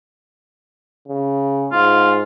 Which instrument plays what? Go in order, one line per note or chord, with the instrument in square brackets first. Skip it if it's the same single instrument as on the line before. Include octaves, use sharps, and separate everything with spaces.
[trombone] C#3
[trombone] G#2 [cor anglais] F4